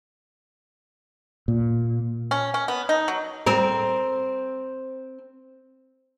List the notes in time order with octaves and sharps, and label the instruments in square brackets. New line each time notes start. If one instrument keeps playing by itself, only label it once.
[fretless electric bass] A#2
[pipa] C#4
C#4
B3
D#4
F#3
[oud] C4 A#4